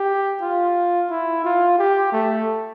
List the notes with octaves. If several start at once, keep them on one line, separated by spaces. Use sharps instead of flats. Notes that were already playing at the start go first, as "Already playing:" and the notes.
Already playing: G4
F4
E4
F4
G4
A3